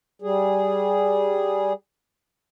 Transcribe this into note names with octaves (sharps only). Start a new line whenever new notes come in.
G3 G#4